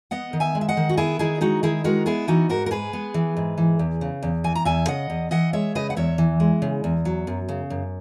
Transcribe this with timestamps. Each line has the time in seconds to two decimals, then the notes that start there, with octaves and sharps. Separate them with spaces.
0.11 B3 D#5 F#5
0.33 D#3
0.40 E5 G#5
0.55 G#3
0.61 E5
0.69 D#5 F#5
0.77 D#3
0.89 F#4
0.97 B3 E4 G#4
1.19 D#3 E4 G#4
1.41 G#3 D#4 F#4
1.63 D#3 E4 G#4
1.84 G#3 F#4 A#4
2.06 B3 E4 G#4
2.28 E3 D#4 F#4
2.49 G#2 F#4 A#4
2.66 A#4
2.71 G#3 G#4 B4
2.93 B3
3.14 E3
3.37 G#2
3.58 E3
3.79 E2
4.01 C#3
4.23 E2
4.44 E3 G#5
4.55 A#5
4.65 E2 E5 G#5
4.88 C#3 D#5 F#5
5.10 E2
5.31 E3 D#5 F#5
5.53 G#3 C#5 E5
5.75 C#3 B4 D#5
5.90 F#5
5.97 E2 C#5 E5
6.18 E3
6.40 G#3
6.62 C#3
6.84 E2
7.05 F#3
7.27 F#2
7.49 C#3
7.70 F#2